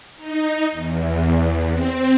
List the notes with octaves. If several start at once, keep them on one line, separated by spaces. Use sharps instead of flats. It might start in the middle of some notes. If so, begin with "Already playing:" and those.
D#4
E2
C4